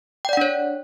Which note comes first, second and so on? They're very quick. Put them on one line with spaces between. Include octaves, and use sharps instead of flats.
G5 D5 F#5 D4 C#5